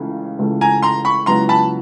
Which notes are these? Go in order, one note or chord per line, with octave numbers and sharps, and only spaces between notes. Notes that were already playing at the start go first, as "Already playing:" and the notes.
Already playing: C#2 C#3 E3 A3
C#2 C#3 E3 A3
G#5 A#5
A#5 C6
B5 C#6
C#2 C#3 F#3 B3 E4 A#5 C6
A5 B5